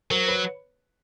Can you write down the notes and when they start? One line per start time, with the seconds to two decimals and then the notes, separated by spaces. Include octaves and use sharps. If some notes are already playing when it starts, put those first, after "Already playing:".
0.11 F#3 A#4 C5
0.28 B4 C#5